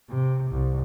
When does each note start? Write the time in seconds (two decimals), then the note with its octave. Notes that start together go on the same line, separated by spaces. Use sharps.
0.10 C3
0.51 C2